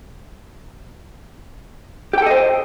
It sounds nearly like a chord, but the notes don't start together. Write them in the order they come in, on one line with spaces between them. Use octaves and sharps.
G4 G5 A4 D#5 C5